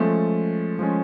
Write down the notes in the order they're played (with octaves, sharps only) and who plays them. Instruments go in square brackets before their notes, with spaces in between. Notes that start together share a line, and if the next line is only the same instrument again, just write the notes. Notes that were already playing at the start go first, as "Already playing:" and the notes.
Already playing: [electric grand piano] F3 G#3 C#4 [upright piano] A3
[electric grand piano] F3 G#3 C#4